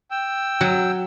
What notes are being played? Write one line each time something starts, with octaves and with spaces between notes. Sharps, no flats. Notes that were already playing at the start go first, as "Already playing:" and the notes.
G5 E6
F#3